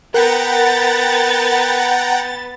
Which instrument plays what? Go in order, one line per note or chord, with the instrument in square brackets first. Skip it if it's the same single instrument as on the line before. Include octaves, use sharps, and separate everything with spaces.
[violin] B3 A6 [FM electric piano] A#4 [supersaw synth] F#5 G5 A#5